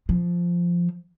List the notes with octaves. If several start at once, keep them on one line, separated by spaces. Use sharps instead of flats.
F3